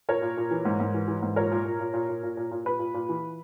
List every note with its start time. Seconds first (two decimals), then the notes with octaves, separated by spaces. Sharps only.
0.08 A#2 A#4 C#5
0.22 A#2
0.37 A#2
0.51 E3
0.65 G#2
0.80 G#2
0.94 E3
1.08 E3
1.23 G#2
1.36 A#2 A#4 C#5
1.52 A#2
1.65 A#2
1.80 A#2
1.94 A#2
2.09 A#2
2.23 A#2
2.37 A#2
2.51 A#2
2.65 A#2 B4
2.79 A#2
2.94 A#2
3.09 E3